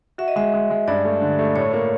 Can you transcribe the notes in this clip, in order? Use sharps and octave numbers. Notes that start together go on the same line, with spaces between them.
F#4 E5
D#5
G#3 E5
G#3
G#3
G2 D5
A3
D3
A3
A2 C#5
A#3